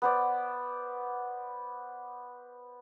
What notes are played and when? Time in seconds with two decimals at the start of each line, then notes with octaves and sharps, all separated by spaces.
0.02 B3 C5 D5